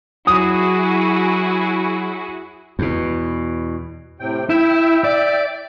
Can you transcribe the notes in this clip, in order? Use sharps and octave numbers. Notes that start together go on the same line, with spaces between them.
F#3 E4 F#4 G#4 D#6
E2 B2
A2 C3 G5
E4 E5 G5
D5